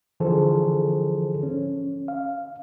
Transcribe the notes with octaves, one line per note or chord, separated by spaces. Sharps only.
D3 E3 F3 G#4 A4 C5
C#4
F5